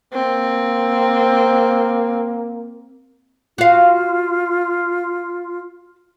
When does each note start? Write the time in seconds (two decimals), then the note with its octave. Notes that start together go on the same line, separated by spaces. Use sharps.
0.14 A#3 C4
3.58 F4 F#4 F5